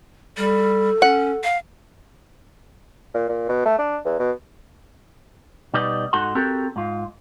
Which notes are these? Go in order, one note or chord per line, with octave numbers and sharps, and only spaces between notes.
G3 A4
C#4 F#5
F5
A#2
A#2
B2
A3
D4
E2
B2
B2 G3 D#4 B4 D5 D#5
G#2 D#4 F#4 A4 F#5 C6
C4 F#4 G4 A4 A#4
G#2 F4